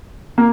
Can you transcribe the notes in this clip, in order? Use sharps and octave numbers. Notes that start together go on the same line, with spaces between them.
A#3